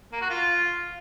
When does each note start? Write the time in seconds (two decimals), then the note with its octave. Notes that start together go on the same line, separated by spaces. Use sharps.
0.12 A#3
0.21 F#4
0.30 F4